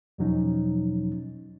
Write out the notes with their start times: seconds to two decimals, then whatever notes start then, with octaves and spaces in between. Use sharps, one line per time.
0.18 E2 B2 F3 F#3 C#4 D#4